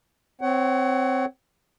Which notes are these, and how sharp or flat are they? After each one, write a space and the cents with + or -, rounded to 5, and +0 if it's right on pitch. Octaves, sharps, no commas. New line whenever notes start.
C4 -5 C#5 +0 F#5 +30